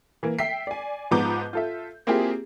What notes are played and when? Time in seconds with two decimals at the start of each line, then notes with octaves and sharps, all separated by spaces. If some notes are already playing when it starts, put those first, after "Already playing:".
0.23 E3 A#3
0.39 E5 G5 B6 C7
0.67 D5 G#5
1.11 G#2 F3 B3 A#5 D6 G6
1.53 F4 A4 E5
2.07 A#3 C4 E4 F4 G4 G#4